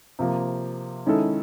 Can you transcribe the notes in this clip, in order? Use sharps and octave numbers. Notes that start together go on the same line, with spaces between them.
C3 F3 A#3
D#3 G#3 C#4 E4 A4